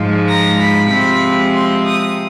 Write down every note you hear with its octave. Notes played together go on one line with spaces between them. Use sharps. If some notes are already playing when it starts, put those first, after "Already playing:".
Already playing: G#2 F3 G#3
A#5
B5
C3 F3 G#3 C4 B5
C6
D#6